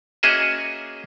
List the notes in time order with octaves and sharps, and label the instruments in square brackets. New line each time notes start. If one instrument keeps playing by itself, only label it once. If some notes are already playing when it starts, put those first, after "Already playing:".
[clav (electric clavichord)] A#3 C#4 F#4 G#4 D#5 E5